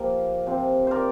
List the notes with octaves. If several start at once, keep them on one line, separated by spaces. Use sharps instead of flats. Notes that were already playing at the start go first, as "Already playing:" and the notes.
Already playing: A#2 F3 A#3 G4 A#4
C3 F3 C4
A#4 C5 D5